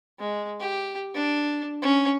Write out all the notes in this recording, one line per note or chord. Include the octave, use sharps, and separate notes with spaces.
G#3
G4
D4
C#4